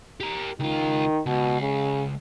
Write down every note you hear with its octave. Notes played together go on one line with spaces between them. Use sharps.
G4 A#4
C#2 D#3 F4
C#2 B2
C#3